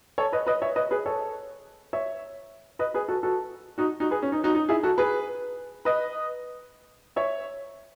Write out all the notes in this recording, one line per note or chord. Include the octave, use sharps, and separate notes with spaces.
A4 C#5
B4 D#5
B4 D#5
C#5 E5
B4 D#5
G#4 B4
A4 C#5
C#5 E5
B4 D#5
G#4 B4
F#4 A4
F#4 A4
D#4 F#4
D#4 F#4
G#4 B4
C#4
D#4
D#4 F#4
D#4
E4 G#4
F#4 A4
G#4 B4
B4 D#5
C#5 E5